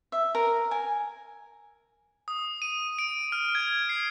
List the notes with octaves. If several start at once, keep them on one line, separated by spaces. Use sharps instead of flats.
E5
A#4
G#5
D#6
D#7
D7
F6
G#6
C7